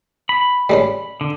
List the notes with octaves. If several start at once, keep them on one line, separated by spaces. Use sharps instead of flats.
B5
G3 G#3 C#4
D3